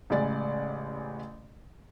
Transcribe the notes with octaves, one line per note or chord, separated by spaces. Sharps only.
A1 C#3 G#3 D5 A6